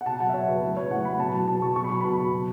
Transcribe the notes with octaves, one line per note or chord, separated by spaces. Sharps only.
F#5
B2 A5
F#3 F#5
E5
B2 C#5
F#3 B4
A2 B4
F#3 C#5
A2 F#5
F#3 B5
B2 A5
F#3
B2 A5
F#3 C#6
B2 C#6
B5
F#3 A5
B2 B5
F#3
B2